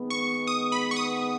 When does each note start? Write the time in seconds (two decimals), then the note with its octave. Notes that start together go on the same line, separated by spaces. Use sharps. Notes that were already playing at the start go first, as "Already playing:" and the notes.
Already playing: D#3 G#3 B3
0.10 C#6
0.47 D#6
0.72 B5
0.91 C#6
0.97 D#6